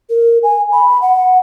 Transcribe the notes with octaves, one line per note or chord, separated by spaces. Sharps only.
A#4
G#5
B5
F#5